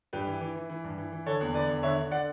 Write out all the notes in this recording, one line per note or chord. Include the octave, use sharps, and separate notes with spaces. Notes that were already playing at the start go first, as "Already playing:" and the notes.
G2 G4 B4
E3
E3
E3
E3
G2
E3
E3
D3 A4 C#5
E2
D3 B4 D5
E2
D3 C#5 E5
D3
D3 D5 F#5